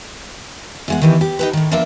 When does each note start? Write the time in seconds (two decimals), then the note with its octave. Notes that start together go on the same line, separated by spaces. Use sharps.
0.88 E2 G#3 F#5
1.02 D#3 E3 G4
1.21 G4
1.39 D#4 G4 B4
1.53 A2 D#3
1.71 F3 A#3 B3 D4 E5